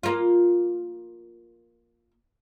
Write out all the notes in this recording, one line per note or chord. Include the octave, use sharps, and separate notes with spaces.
A#3 F4